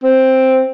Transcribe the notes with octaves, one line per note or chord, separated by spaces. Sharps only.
C4